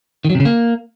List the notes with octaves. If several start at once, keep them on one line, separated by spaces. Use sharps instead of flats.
D#3
F#3
C3
C#3
A#3